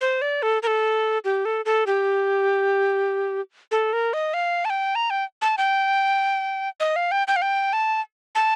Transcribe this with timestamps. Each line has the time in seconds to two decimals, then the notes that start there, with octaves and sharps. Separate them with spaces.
0.01 C5
0.22 D5
0.43 A4
0.63 A#4
0.67 A4
1.25 G4
1.45 A4
1.65 A4
1.87 G4
3.72 A4
3.93 A#4
4.13 D#5
4.34 F5
4.65 A5
4.70 G5
4.95 A#5
5.10 G5
5.42 A5
5.58 G5
6.80 D#5
6.96 F5
7.11 G5
7.28 G5
7.36 F5
7.42 G5
7.73 A5
8.35 A5